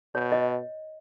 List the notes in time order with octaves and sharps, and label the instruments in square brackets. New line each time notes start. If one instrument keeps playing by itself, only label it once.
[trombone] B2 [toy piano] C#5
[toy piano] D#5